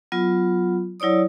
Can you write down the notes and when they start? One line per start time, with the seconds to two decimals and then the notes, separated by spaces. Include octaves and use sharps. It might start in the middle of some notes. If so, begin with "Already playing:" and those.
0.12 F#3 B3 F4
1.00 F#3 E4 C#5 D5 D#6